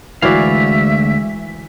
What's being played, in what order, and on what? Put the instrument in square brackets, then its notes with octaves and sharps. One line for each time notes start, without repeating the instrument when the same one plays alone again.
[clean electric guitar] D2 F5 [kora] E3 F#4 D5 [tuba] G#3 [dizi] E5